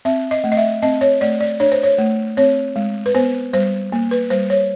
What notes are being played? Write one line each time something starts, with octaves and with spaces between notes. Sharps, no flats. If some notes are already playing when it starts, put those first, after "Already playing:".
C4 E5
D#5
A3
D#5
E5
C4 D#5
C#5
A3 D5
D5
D4 C#5
C5
C#5
A3
C4 C#5
G#3
B4
B3 C5
G3 C5
A#3
B4
G3 C5
C#5